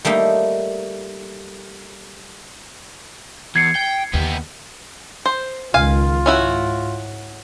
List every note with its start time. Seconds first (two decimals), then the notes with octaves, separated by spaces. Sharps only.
0.05 G3 A3 A#3 D#4
3.56 E2 G#6 C7 C#7
3.76 G5
4.14 D#2 B3 G4
5.26 C5
5.74 C#2 D#3 F4 F5 G#5
6.26 G#2 C#4 E4 F#4